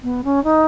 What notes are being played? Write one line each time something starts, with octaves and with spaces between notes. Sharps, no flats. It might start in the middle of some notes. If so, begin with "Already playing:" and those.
B3
C#4
D#4